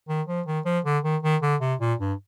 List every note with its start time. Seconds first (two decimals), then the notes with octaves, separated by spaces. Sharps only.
0.09 D#3
0.28 F3
0.46 D#3
0.66 F3
0.85 D3
1.04 D#3
1.23 D#3
1.43 D3
1.61 C3
1.80 A#2
2.00 G2